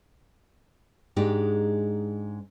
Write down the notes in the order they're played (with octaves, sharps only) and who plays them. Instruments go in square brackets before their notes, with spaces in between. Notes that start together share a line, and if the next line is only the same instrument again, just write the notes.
[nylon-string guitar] G#2 G#3 D4 D#4 G4